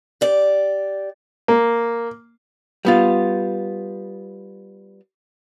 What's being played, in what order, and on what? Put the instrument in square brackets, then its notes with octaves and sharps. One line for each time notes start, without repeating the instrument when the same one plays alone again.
[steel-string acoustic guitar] G4 D5
[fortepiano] A#3
[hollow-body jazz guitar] G3 B3 F4